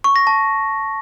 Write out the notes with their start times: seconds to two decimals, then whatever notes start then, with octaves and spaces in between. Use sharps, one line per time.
0.04 C#6
0.16 A#6
0.27 A5